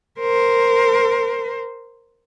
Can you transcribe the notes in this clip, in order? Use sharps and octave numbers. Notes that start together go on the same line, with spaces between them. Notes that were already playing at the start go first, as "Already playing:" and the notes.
A#4 C5